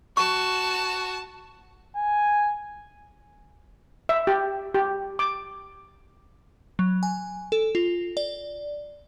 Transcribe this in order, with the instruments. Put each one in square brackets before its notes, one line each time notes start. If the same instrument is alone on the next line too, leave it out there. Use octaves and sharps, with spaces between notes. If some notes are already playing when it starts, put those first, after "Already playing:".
[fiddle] F#4 [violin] A5 [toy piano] C#6
[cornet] G#5
[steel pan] E5
G4
G4
D6
[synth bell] F#3
G#5
A4
F4
D5